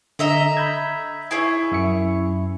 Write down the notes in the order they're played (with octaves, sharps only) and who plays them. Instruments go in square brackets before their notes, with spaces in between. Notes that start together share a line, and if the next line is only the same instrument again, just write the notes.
[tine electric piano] D3 [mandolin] D#5 E5 A#5
[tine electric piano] B5 G6 G#6
[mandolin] E4 G#4 C#5
[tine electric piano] F#2 E5 C#7